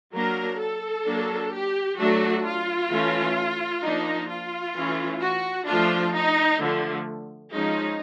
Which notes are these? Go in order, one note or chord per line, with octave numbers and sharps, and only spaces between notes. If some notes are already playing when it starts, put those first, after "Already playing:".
F#3 A#3 D4 A#4
A4
F#3 A#3 D4
G4
F#3 A3 D4 F#4
F4
E3 A3 C#4
F3 A#3 D4 D#4
F4
E3 A3 C#4
F#4
F3 A3 D4 F4
D#4
D3 F3 A3
F3 G#3 C#4 D#4